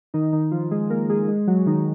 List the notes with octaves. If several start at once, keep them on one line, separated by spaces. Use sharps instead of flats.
D#3 D#4
D#3 D#4
F3 F4
G#3 G#4
A#3 A#4
G#3 G#4
G#3 G#4
F#3 F#4
D#3 D#4